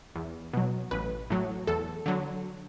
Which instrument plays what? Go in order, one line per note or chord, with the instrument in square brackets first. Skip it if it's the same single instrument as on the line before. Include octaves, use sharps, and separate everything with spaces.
[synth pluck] E2
B2 F#3
A1 B4
A2 F#3
E2 A4
D3 F#3